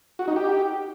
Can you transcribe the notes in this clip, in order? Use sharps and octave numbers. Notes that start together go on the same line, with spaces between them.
F#4
D#4
G4